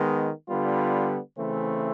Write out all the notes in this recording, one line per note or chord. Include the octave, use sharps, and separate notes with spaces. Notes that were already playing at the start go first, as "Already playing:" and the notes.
Already playing: D#3 G#3 B3
D3 G3 B3 F4
C#3 E3 A3 C4